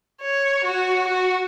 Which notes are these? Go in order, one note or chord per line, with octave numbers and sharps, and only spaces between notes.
C#5
F#4
F#4